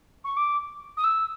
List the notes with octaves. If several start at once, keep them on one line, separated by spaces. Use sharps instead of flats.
C#6
D6
D#6
E6